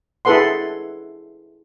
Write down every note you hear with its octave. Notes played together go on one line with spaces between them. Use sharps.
E4 G#4 A4 B4 F#5 C6